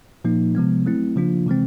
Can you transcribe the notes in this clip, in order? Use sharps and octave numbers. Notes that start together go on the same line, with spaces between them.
A#2 F3 A#3 D#4
C3 F3 G#3 B3
F#3 A3 C4 E4
C#3 F3 A#3 D4 F4
C3 E3 G#3 C4